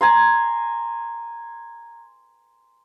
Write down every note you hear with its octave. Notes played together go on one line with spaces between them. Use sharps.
G#5 A#5 C6